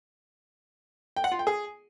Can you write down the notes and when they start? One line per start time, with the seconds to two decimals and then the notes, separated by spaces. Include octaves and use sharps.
1.16 G5
1.24 F#5
1.32 F4
1.39 G5
1.47 G#4